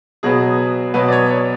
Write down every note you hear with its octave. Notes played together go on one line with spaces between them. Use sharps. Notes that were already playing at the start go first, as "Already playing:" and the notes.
B2 F#3 B3 G#4
B2 F#3 B3 B4
D5
C#5
C#5